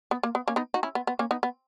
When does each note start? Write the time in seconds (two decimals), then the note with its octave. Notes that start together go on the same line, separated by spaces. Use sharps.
0.11 B3
0.23 A#3
0.35 B3
0.48 A#3 C#4
0.56 B3 D#4
0.74 D#4 F#4
0.83 C#4 E4
0.95 B3
1.07 B3
1.19 A#3 C#4
1.31 B3 D#4
1.43 B3